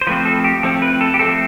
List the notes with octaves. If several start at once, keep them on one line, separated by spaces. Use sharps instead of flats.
C5
F3 A3 C4 B4
A4
G4
F3 A3 C4 A4
B4
A4
G4
F3 A3 C4 A4